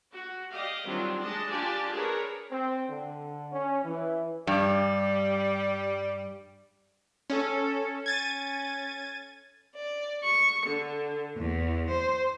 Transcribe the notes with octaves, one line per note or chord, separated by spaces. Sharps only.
F#4
G4 D5 D#5 F5
D#3 F#3 G3 C4 D4 F4
G#3 D4 D#5 A5
D4 F4 G4 D5 G#5 A5
D4 G#4 A#4 B4 C#5
C4
D3
C#4
E3
G2 G3
C#4 A4
C#4 G#6 A6 D#7
D5
C#6
D3
E2
C5